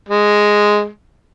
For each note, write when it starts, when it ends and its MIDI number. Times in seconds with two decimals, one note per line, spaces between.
0.09 0.88 56